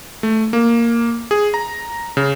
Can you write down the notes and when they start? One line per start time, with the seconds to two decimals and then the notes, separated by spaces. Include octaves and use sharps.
0.23 A3
0.53 A#3
1.31 G#4
1.54 A#5
2.17 C#3